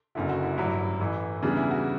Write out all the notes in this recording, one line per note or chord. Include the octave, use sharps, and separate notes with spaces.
F#1 F#2 D3 E4
F#4
E4
A1 G2 F#3 E4
A1 A2 E3
E2 C#3 E3 G3 D4
E4
F#4